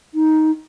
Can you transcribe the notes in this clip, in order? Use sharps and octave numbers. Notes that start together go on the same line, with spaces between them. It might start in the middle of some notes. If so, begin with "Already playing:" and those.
D#4